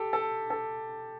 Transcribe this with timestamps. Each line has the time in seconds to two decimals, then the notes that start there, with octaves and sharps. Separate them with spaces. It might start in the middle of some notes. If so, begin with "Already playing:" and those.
Already playing: G4 A4
0.13 A4
0.50 A4